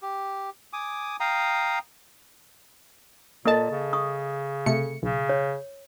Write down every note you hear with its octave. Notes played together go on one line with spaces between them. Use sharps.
G4
G#5 D6 D#6
F5 G5 A#5 D#6
A#2 A#3 A4 D#5 A5
C#3
C#6 D#6
C3 A3 C#7
B1 C#3
C#5